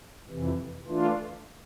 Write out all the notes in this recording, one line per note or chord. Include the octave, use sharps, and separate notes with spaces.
F2 C3 E3
E3 A3 D4 F4